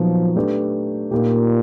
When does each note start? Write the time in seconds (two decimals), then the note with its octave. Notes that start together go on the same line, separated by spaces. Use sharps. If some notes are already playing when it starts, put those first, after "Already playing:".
Already playing: A#2 F3 F#3 B3 D#4
0.36 A3 D4 G4 B4
1.11 A#2 A#3 D#4 G4